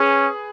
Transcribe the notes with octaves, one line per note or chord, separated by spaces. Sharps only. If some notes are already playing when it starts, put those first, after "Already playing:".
Already playing: C#4 G#4 B4